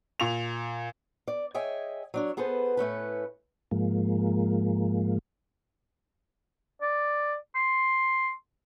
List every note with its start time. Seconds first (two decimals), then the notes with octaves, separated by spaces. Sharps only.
0.20 A#2 F7
1.28 D5
1.54 G#4 C#5 D#5 E5 G5 G#5
2.14 F#3 D4 C#5
2.37 B3 G#4 A4 B4 C5
2.77 A2 A3 C#4 B4
3.71 G#2 F3 G#3 A#3
6.82 D5
7.55 C6